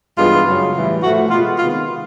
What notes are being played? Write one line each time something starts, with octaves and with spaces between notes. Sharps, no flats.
G2 E3 G#3 B3 F4
F#2 C#3 F#3
A2 E3 G3
A2 F3 A3 F#4
B2 G#3 B3 F4
C3 D#3 G#3 B3 F4